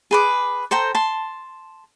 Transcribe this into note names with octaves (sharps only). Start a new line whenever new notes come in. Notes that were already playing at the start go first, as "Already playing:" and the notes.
G#4 B4 D6
A4 C5 G5 A#5
A5 C6